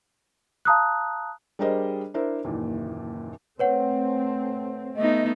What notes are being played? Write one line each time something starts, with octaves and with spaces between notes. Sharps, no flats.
F5 A5 A#5 D#6 E6 F#6
G3 D4 G#4 A#4 C5 D#5
D4 E4 A#4 C5 E5
F#1 D#2 A#2 E3
A3 C4 B4 C#5 F#5
A3 B3 D#4 D#5